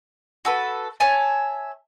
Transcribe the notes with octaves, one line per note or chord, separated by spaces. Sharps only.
F#4 A4 B4
C#5 E5 G#5 A5